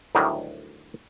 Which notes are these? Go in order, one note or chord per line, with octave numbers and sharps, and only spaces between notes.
D2 A2 D#3 F#3 G3